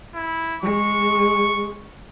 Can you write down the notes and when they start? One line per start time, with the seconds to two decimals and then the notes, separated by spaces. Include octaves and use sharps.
0.15 E4
0.63 G#3 C#6